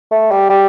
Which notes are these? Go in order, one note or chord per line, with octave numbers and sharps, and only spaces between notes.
A3
G3
G3